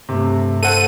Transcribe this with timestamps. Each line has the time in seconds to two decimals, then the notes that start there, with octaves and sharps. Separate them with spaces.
0.09 G2 C3 A3
0.63 A4 C5 F#5 D#7